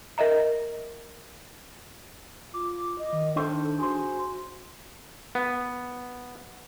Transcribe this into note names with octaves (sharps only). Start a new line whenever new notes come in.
A#4 D#5 E5 A#5
F4 D6
D#5
D#3
D#3 D4 E4 A4 C5
F#4 G#4 C5
B3